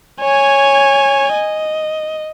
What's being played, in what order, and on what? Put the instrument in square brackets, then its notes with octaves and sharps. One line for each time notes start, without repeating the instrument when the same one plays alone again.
[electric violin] C#5 G#5
D#5